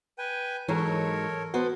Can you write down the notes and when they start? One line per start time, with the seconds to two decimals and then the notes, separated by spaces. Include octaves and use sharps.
0.18 B4 G5 G#5
0.68 G#2 E3 F#3 A4 A#4 C#5
1.54 B3 F#4 A4 C5